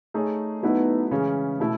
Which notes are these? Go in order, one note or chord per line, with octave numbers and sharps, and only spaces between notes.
A3 D#4 G#4 C#5
F#3 A3 B3 D#4 E4 B4
C#3 E3 G#3 C#4 G#4
B2 A3 E4